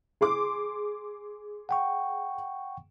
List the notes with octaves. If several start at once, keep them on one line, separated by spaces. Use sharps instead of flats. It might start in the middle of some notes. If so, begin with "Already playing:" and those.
G#4 C6 D6
F#5 G5 C#6